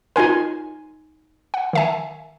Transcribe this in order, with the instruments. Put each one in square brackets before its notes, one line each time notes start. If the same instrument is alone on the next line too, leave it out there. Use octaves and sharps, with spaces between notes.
[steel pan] D#4 G#5 C6 [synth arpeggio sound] F4 A#4
[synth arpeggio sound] F#5
D#3 E5 G#5